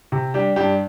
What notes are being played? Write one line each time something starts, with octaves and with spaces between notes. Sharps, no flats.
C3
G3 D4 G4
G2 D4 G4